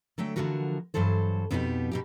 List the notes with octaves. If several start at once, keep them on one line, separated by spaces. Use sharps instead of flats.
D3 F#3 A3 G5
D3 E3 F3 C#4 F#4 A#4
G2 E3 F#3 A4 C5
F2 B2 B3 D#4 F4 G4
B2 D#4 G4